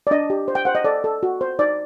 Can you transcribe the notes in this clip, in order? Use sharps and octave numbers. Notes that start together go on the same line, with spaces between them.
D5
D4 D#5
G4
C5
G5
C5 F#5
D#5
A4 D5
A4
F#4
C5
D#4 D5